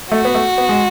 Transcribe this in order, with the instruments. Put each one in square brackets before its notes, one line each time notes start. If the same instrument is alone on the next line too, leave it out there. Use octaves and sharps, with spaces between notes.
[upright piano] A3 [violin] F#4
[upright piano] B3
A3
B3
G#3